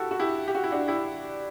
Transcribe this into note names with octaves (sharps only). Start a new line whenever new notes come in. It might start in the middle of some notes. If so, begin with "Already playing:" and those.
Already playing: E4 F#4 G4 A4
F#4
E4 G4
G4
F#4
E4
D4 F#4
E4 G4